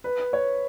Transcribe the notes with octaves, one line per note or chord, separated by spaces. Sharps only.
B4
C#5